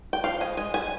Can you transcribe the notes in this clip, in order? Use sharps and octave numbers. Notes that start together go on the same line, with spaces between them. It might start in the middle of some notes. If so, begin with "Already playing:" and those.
G5
F3 F5
G#3 G#5
G#3 G#5
G3 G#5